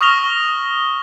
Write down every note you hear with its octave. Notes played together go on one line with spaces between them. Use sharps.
C#6 D#6 F6 A#6 F7 G7